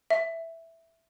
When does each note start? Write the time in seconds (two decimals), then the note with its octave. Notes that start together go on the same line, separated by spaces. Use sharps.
0.10 E5